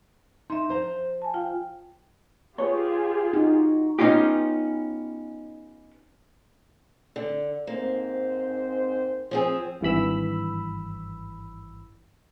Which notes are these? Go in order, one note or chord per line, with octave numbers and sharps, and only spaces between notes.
D#4 E5 C6
F3 C5 A#5
G#5 A5
F4 F5 G5
F4 G4 G#4 B4 C#5
D#4 F#4
B3 C#4 D#4 F4 G4
D3
G#2 A#3 C4 C5
F3 C4 G#4
G#1 G2 E3 B5 E6